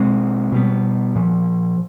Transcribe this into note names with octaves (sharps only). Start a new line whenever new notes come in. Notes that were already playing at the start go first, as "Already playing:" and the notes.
Already playing: B2 G#3 C4
B2 G3 B3
A#2 F3